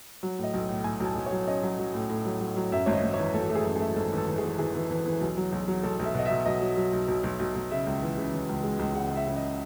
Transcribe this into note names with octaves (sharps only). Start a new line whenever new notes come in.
F#3
A2 D#5
B1
A2
A2 G#5
B1
A5
B1
C#5
F#3
C#4 D#5
F#3
F#3
A2
A2
F#3
F#3
F#3
F#2 E5
G#1 C#5
D#5
G#1
E3 C#5
G#1 A4
A3
G#4
F#2
A3 G#4
G#1 A4
E3 A4
E3
G#4
E3
E3 G#4
E3
E3
E3
B1
F#3
B1
F#3
B1 A4
B1 E5
B2 D#5
B2 E5
B1 D#5
F#3
F#3
B1
B1
B1
B1
B1
C#3 E5
C#2
E3
C#3
E3
C#2
G#3
C#2
C#3 F#5
C#2 E5
C#3
D#5